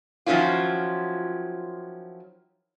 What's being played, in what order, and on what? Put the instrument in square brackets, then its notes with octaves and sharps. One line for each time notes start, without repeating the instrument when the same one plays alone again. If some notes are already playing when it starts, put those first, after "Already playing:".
[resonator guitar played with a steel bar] D#3 F3 F#3 C#4 E4 F4